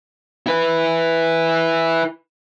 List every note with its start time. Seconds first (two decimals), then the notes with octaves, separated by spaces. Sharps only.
0.46 E4 B4